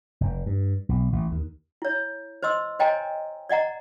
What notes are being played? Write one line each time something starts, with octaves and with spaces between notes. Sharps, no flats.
F1
G2
B1
A1
D#2
E4 C#5
C5 D#5 C6 E6
C5 C#5 D#5 G5 G#5 A#5
D5 D#5 F#5 A#5